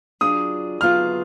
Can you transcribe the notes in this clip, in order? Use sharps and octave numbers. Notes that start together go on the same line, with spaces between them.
F#3 D4 F4 G#4 D#6
F#3 B3 F4 G#4 F6